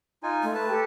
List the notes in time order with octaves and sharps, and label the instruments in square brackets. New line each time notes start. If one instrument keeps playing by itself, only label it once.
[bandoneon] D#4 F4 G#5
[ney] A3
[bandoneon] B4 A5
[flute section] G4 A4 G5